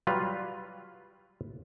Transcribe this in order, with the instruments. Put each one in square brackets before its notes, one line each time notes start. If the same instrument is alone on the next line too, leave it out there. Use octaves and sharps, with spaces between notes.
[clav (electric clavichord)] F#3 G3 F4 B4